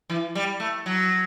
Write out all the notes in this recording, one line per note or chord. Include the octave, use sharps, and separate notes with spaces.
E3
G3
A3
F#3